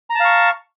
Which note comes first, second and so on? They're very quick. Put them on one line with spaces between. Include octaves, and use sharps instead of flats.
A#5 A5 F5 C#6